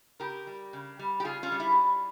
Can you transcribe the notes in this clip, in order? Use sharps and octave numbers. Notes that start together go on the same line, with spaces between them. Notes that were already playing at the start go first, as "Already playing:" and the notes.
C#3 G4 A#4
G3
C#3
G3
G4
C#3 F4 G#4
C#4 F4
G3
E4